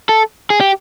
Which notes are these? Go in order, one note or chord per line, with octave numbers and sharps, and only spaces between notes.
A4
G#4
G4